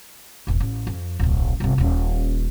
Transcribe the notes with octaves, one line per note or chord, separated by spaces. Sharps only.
E1 A#1
A1
F2
D1 B1
G1 C3
D#1 C#4